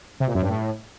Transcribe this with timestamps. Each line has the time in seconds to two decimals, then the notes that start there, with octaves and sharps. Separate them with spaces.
0.20 C3
0.27 A#2
0.35 F#2
0.42 G2
0.49 A2